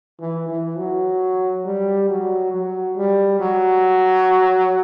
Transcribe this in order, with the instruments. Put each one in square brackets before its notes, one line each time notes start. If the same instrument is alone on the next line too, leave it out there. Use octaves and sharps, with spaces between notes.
[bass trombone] E3
E3
F#3
G3
F#3
F#3
G3
F#3